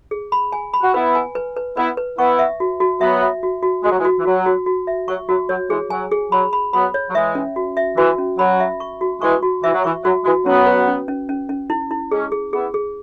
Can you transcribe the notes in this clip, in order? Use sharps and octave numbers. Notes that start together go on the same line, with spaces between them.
G#4
B5
G#5
B5
F#4
B3 E4 B4
G#5
B4
B4
B3 E4 B4
B4
B3 E4 C#6
E5
F#4
F#4
F#3 B3 E5
E5
F#4
F#4
G#3 F#4
F#3
E3 G#3
F#4
E3
F#3 F#4
F#4
F#4
E5
F#3 C#6
F#3 F#4
F#3 C#5
E3 G#3 G#4
F#3 G#5
G#4
F#3 B5
B5
F#3 B3 B5
C#5
F#3
E3 G#3 E5
C#4
F#4
E5
E3 F#4
C#4
F#3 B5
E5
C#6
F#4
E3 G#3 C#6
F#4
E3 E5
F#3
E3 C#6
F#3 F#4
E3 G#3 F#4
F#3 B3 C#4
B4
C#4
C#4
C#4
C#4
E4
E4
G#3 C#4 G#4
G#4
B3 E4 G#4
G#4